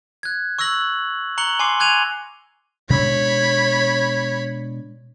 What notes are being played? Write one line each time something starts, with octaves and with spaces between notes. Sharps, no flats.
F#6 G#6
C#6 E6 F#6 A#6 F#7
A#5 C#6 F#6 C#7 F#7 G7
G#5 C6 D6 C7
F#6 G#6 D#7 F7
B2 G#3 D4 C#5 B5